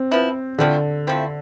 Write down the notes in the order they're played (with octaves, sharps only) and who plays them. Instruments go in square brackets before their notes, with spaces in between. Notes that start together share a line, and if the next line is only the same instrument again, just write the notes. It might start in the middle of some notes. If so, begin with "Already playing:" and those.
Already playing: [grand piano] C4
[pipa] F3 B3 E4
[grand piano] D3 [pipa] F3 A3 C4 E4
[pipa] F3 A3 C4 E4